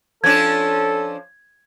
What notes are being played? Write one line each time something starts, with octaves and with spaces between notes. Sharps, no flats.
F3 C#4 D4 A4 G#6